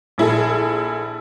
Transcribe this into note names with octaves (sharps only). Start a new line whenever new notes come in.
A#1 E4 G#4 A4